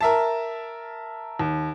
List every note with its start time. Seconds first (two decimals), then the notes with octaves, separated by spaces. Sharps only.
0.01 A#4 E5 A5
1.39 D#2